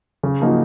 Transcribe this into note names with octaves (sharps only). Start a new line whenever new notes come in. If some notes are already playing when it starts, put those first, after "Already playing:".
C#3
F3 A#3 D#4 F#4